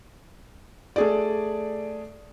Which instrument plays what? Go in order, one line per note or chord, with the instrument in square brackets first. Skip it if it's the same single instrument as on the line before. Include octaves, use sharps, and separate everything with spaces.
[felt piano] A3 G#4 D5